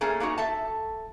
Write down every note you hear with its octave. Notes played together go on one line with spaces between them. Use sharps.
A3 A#3 C#4 G#4 A#4
A#3 B3 D#4 F#4
A4 E5 A5